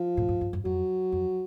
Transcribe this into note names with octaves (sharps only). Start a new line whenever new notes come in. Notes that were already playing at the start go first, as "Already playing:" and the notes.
Already playing: F3
A2
G#2
G2
F#2
F2 F#3
F2